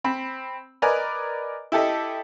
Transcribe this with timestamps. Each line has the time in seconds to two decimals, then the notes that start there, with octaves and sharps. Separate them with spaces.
0.04 C4 B5
0.82 A#4 B4 D5 D#5 G#5 A#5
1.72 E4 G4 A4 D#5